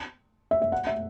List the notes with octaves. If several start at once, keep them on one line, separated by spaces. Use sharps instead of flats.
E5
E5
F#5
E5